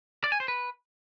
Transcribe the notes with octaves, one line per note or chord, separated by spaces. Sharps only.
D5
G#5
C5
B4